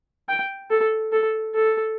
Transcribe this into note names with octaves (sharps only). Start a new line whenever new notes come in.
G5
A4
A4
A4